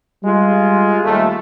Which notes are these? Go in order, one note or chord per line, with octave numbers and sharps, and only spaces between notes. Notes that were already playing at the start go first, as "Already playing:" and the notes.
G3 G#3 F4
D#2 A3